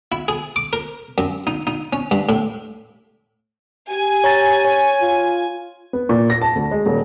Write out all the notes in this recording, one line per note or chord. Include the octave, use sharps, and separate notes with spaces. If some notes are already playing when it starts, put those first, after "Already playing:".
E4
G#4
D6
A#4
F#2
D#4
D#4
C#4
G2
A2
G4 G#5
C#5 A#5 A6
C#5
F4
B3
A#2
A#6
A5
D2
G#3
D#1